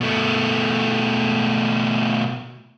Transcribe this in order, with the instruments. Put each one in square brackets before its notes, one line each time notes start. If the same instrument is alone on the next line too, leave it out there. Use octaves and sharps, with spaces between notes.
[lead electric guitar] B2 A3